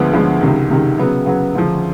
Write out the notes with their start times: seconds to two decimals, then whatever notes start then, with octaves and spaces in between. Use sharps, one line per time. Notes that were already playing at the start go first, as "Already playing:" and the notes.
Already playing: D2 D3 F3 G#3 B3
0.13 D2 D3 F3 G#3 B3
0.41 C#2 C3 D#3
0.70 C#2 C3 D#3
0.99 C#3 F#3 B3
1.26 C#3 F#3 B3
1.55 D2 C#3 F3